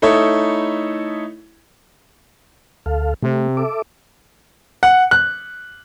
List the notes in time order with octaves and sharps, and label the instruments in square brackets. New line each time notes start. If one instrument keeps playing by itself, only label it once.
[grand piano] A3 D#4 E4 A4 C#5 E5
[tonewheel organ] D2 A4 F5
[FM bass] C3 [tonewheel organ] A3
[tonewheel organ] A4 E5 D6
[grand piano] F#5
F#6